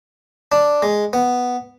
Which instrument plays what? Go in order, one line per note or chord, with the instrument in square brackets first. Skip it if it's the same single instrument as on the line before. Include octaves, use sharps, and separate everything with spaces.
[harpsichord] D4
G#3
B3